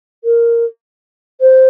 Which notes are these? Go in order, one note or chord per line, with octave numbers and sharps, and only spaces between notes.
A#4
C5